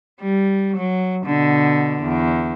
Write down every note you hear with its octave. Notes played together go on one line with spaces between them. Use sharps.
G3
F#3
B2 D3
E2